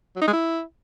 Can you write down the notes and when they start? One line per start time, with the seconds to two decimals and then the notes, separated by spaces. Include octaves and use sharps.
0.16 F#3
0.22 D#4
0.27 G#3
0.33 E4